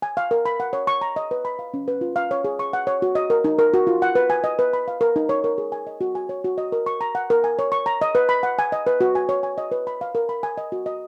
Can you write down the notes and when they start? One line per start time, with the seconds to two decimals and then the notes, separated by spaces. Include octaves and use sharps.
0.02 G#5
0.17 F5
0.31 A#4
0.45 B5
0.60 F#5
0.73 C#5
0.87 C#6
1.01 A#5
1.16 D#5
1.31 B4
1.45 B5
1.59 F5
1.74 C#4
1.88 B4
2.01 F4
2.16 F5
2.31 C#5
2.44 G#4
2.59 C#6
2.73 F#5
2.87 C#5
3.02 F#4
3.15 D#5
3.30 A#4
3.44 D#4
3.59 A#4
3.74 F#4
3.87 F4
4.02 F#5
4.15 B4
4.30 G#5
4.44 D#5
4.59 B4
4.73 B5
4.88 F5
5.01 A#4
5.16 D#4
5.29 C#5
5.44 A#4
5.58 G#4
5.72 G#5
5.87 D#5
6.01 F#4
6.15 G#5
6.29 C#5
6.44 F#4
6.58 D#5
6.72 A#4
6.86 C#6
7.01 A#5
7.15 F#5
7.30 A#4
7.44 G#5
7.59 C#5
7.72 C#6
7.86 A#5
8.01 D#5
8.15 B4
8.29 B5
8.43 F#5
8.59 G#5
8.72 D#5
8.87 B4
9.01 F#4
9.15 G#5
9.29 C#5
9.43 G#5
9.58 D#5
9.71 B4
9.87 B5
10.01 F5
10.15 A#4
10.29 B5
10.43 G#5
10.58 D#5
10.72 F#4
10.86 D#5